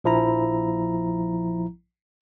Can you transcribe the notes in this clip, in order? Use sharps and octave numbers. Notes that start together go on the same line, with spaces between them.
A#1 F3 E4 A#5